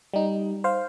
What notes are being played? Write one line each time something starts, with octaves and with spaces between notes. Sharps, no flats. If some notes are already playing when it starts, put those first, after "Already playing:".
G3 D#4
C5 F5